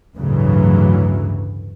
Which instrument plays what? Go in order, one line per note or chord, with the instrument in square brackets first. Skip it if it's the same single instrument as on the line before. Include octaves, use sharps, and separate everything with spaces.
[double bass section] A1 D2 G2 C#3 E3 F#3